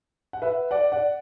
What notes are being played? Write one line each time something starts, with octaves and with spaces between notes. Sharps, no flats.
F#5
B4 E5
D5 F#5
D5 F#5